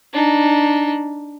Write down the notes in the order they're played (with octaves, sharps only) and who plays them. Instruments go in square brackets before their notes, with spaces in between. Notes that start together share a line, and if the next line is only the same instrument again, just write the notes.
[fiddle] D4 D#4